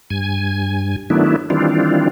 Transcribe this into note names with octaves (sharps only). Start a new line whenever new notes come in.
G2 G#5
D#3 F#3 A3 B3 D4 E4
D#3 E3 G3 C4 D4 F4